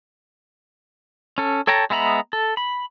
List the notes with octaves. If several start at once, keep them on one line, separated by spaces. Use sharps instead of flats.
C#4 A4
A4 C#5 G5 A5 A#5
G#3 B3 E5 A#5 B5
A4
B5